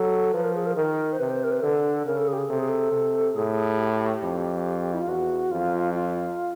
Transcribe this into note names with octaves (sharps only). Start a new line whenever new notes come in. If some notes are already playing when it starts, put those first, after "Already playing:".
Already playing: F#3 A4
F3 B4
A#4
G#4
A#4
D#3 A#4
C5
C3 B4
C5
A#4
B4
D3 A4
C#3 A#4
A4
G#4
G4
G#4
C3 A4
G#4
A4
C3
A2 G#4
G4
F2
E4
F4
E2 F#4
F2 F4
F4